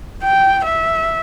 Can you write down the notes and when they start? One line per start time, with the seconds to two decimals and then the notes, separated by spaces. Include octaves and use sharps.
0.24 G5
0.65 E5